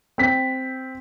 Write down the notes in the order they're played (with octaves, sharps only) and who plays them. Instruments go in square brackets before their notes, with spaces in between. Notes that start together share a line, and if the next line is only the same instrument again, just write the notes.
[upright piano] C4 B6